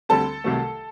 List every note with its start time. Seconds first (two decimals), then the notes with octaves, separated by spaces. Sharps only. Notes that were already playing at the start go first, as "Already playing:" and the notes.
0.09 D2 D3 G3 C4 A4 A5
0.44 C2 C3 D#3 F#3 A3